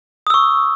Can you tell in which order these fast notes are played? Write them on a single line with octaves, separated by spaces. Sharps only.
D#6 E6 C#6